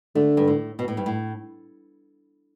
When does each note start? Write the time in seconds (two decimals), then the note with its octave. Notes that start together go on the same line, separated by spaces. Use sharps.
0.15 D3 A3
0.37 G2
0.48 A2
0.79 B2
0.88 A2
0.97 G2
1.06 A2